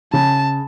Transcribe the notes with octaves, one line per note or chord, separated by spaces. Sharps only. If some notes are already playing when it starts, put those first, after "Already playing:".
C#3 A5